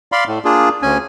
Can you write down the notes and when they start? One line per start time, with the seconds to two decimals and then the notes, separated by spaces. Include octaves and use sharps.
0.12 D5 F5 B5 C6
0.27 A2
0.45 A#3 D4 F4 G#4
0.82 D2 C#4 G#5